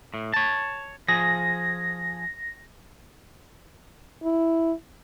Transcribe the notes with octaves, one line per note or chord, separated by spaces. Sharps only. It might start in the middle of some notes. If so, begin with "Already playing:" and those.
A2
C#5 A5
F3 G#4 A#6
E4